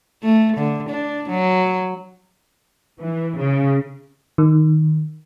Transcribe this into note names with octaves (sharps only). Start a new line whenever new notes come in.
A3
D3
D4
F#3
E3
C#3
D#3